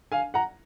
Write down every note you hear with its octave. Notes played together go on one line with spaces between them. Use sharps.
F5 G#5
F#5 A#5